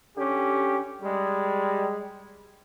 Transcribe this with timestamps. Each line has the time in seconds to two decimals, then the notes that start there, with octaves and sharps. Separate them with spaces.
0.17 D3 C#4 G4
1.02 G3 G#3